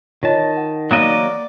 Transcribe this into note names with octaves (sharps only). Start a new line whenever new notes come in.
D#3 F4 C#5 D#5 A5
F#5
F#3 A#3 D5 D#5